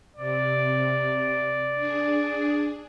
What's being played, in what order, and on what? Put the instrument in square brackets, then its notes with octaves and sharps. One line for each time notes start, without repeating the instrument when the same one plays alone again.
[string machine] C3 [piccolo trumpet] D5
[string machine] D4 G#4